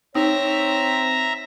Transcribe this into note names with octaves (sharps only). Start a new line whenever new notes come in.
C4 D#4 C#5 E5 A#5